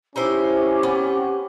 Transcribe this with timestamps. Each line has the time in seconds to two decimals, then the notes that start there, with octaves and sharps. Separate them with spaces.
0.16 C#4 D#4 E4 G4 C5
0.83 B3 C4